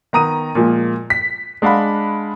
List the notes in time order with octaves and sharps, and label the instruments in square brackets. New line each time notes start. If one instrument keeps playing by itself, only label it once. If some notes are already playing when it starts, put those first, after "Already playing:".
[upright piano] D#3 B3 A#5 D#6 D#7
A#2 F3 G#3
B6
G#3 D4 F5 F#5 B5